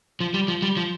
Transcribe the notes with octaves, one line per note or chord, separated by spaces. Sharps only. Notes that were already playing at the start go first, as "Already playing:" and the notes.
F3
G3
F3
G3
F3